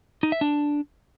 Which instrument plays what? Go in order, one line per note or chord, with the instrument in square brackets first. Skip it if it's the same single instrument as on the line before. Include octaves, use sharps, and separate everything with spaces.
[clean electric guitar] D#4
E5
D4